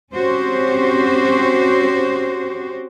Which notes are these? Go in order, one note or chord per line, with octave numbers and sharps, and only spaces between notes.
C4 C#4 F#4 G4 C5